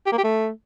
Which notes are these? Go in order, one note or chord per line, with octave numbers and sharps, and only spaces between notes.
G4
A#3
G4
A3